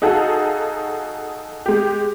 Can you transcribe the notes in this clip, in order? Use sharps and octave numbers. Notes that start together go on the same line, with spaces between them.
D#4 F#4 G#4 A4 F5
G#3 G4